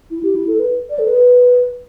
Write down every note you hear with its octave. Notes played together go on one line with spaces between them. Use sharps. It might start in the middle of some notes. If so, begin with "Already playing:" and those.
E4
G4
E4
A4
B4
D5
A4
B4